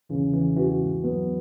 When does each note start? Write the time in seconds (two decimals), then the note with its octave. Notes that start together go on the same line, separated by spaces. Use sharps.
0.09 E2 C#3 E3
0.33 E2 E3
0.57 E2 E3 F#4
0.80 G#2
1.04 F#2 F#3 B3